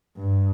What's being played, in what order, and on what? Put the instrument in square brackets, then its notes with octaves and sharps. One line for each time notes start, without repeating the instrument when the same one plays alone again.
[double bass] G2